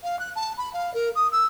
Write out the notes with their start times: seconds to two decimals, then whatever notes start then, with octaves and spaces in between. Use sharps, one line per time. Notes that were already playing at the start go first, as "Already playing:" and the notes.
0.03 F5
0.19 F#6
0.35 A5
0.57 B5
0.73 F5
0.93 A#4
1.15 D#6
1.32 E6